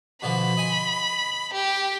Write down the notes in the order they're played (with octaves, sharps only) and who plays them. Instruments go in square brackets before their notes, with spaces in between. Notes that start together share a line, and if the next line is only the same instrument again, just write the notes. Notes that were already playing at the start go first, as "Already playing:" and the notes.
[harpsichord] B2 D3 F3 [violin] B5
[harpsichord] D#5 G#5 C6
[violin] G4